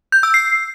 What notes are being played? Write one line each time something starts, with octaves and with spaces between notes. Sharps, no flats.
G6
E6
C7